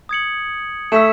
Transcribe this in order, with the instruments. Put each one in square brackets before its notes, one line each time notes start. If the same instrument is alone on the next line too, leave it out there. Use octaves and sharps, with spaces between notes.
[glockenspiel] D#6 G#6 C#7 F#7
[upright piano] A3 [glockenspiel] E6 B6 E7